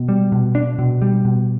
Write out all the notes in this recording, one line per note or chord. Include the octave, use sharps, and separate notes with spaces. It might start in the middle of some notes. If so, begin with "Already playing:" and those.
Already playing: B2
G3
B2
D4
B2
G3
B2